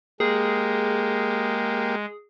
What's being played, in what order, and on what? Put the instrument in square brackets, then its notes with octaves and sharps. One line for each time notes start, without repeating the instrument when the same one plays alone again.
[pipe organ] G#3 [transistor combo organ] A#3 G4 [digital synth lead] G#4